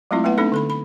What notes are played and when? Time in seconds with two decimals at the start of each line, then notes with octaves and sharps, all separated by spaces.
0.11 F#3 G#3 A3 C4 E4 F4
0.24 A3 B3 E4 B4 F#5
0.38 A3 C4 D4 D#4 A4
0.52 D3 A4 B5
0.70 B5